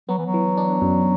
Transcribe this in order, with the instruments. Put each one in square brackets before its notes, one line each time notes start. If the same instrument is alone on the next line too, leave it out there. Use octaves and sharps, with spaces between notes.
[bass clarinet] F#3 [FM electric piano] B3
[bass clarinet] E3
F#3
[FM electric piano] E3
D4
F#2